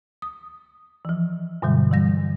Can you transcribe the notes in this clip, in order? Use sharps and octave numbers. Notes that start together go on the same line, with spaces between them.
D#6
E3 F3
G2 B2 D3 F#3 G3
E3 G3 A#6